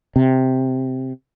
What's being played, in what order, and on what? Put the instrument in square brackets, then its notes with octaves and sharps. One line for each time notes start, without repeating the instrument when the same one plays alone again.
[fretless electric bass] C3